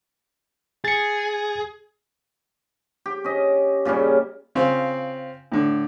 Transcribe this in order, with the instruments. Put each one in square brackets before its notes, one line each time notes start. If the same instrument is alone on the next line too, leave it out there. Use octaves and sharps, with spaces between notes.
[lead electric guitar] G#4 [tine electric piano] A6 C#7
[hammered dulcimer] G4
C#4 D#5
A#2 C#3 G3 C#4
[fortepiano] C#3 C4 F4
A2 D3